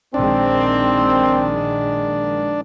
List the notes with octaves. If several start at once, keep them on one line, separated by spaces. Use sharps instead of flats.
A#1 D#3 G#3 C4 D4